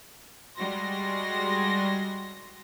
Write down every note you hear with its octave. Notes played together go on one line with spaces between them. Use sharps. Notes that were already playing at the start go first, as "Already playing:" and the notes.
G3 G#3 F#4 C6 A#6